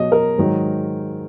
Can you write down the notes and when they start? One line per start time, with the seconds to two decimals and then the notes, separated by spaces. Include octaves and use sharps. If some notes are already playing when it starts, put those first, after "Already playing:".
Already playing: B2 F#3 D#5
0.12 A#4
0.38 G#2 D#3 F#3